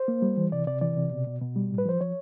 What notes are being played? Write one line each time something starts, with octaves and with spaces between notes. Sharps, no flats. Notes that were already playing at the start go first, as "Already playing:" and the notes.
Already playing: C5
A#3
G3
E3
C3 D5
C3 D5
E3 D5
C3
B2
B2
B2
G3
A2
B4
F3 C5
F3 C#5